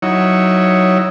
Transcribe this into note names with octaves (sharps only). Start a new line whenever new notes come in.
F#3 D#4 E4 C#5